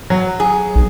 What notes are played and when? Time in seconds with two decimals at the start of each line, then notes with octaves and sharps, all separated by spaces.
0.10 F#3
0.40 G#4
0.75 B1